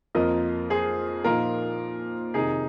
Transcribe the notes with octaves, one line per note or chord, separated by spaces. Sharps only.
F2 F3 A#3 F4 A#4 D#5
G#4 C5
A#2 F3 A#3 D#4 F4 A#4
F2 C3 D#3 D#4 G#4